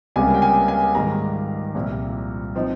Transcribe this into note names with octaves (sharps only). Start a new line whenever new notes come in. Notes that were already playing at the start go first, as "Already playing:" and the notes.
C#2 C3 G3 A#3 C#4 G#5
G5
G#5
G#5
G#2 D#3 G3 A#5
C2 A#2 F3
F3 C4 D#4